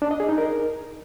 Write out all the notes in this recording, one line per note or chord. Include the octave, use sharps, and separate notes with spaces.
D4
D#5
G#4
D#4
A#4